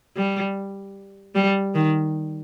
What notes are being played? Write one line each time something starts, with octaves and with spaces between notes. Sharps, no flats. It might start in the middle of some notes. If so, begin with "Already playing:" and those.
G3
G3
D#3